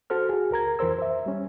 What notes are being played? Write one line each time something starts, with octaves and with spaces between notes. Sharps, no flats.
F#4 A4 C5 F6
F#4 G#4
C#2 A#4 A#5 G#6
F2 E3 A#4 C5 E6
C5 E5
G3 C#4